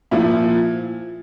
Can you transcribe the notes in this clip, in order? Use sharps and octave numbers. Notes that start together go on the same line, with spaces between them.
A#2 F3 E4